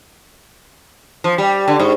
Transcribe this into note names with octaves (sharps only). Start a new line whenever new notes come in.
F3
G3
D3
G#2